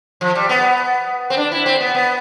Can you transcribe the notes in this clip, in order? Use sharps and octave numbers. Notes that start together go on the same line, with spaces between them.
F3
G3
B3
C4
D4
E4
C4
B3
B3